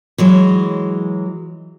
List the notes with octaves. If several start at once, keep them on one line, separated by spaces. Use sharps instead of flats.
E3 F#3 G#3